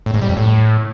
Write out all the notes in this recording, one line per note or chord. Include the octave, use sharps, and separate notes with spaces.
A2
G#2
G3
F2
A2